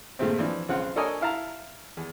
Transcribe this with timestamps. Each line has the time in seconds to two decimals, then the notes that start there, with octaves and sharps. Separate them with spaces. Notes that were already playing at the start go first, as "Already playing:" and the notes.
0.19 G2 A#2 G#3 A3 C4
0.38 E3 F3 C4 D4
0.68 B1 C#3 C4 F4 F#5
0.96 D4 A4 A#4 C#5 D#5 G#5
1.21 E4 F5 A5 A#5
1.97 E2